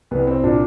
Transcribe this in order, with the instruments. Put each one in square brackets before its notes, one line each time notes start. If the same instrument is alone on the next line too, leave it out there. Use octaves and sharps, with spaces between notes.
[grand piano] C2 B3
C4
A#2 D4